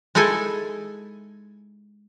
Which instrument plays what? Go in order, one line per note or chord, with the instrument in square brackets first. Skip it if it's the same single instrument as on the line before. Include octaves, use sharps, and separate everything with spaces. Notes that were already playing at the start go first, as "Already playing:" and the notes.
[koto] G#3 D#4 E4 A4 G#5